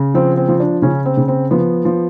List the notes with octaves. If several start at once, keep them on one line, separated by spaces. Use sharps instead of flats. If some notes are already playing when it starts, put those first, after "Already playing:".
Already playing: C#3
F3 C4
C4
F3
D4
C#3 C#4
C4
C#3
C4
F3 B3
F3